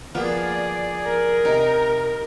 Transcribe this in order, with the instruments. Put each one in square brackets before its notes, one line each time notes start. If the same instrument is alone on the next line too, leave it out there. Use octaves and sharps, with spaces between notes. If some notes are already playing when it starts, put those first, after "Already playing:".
[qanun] F3 [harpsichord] A#3 B3 [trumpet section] G#4 D5
[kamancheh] A#4
[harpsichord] C3 [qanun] D#4